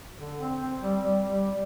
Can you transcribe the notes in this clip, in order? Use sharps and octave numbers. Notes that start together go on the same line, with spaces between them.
D3
C4
C4
G3
G3
G3